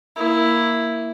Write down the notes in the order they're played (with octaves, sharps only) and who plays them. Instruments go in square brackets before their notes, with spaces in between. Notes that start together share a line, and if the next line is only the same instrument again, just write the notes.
[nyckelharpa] A#3 E4